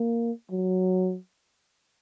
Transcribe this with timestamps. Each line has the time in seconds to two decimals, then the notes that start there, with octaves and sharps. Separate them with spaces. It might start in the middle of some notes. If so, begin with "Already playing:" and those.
Already playing: A#3
0.51 F#3